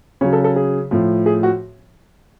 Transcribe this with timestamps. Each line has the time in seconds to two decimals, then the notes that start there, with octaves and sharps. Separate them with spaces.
0.21 C#3 F#3 C#5
0.33 A4
0.44 A4
0.56 G#4
0.91 A2 F3
1.26 G#4
1.43 F#4